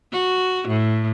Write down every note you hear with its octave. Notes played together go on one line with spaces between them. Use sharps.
F#4
A2